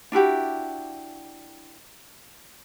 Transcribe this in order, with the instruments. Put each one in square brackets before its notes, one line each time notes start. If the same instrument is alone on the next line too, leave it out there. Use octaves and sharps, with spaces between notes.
[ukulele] D4 E4 F#4 G4